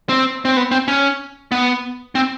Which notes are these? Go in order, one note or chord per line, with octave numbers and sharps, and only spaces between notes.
C4
C4
B3
C4
C#4
B3
C4